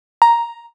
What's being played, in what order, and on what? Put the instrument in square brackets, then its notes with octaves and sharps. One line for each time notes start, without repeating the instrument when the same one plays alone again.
[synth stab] A#5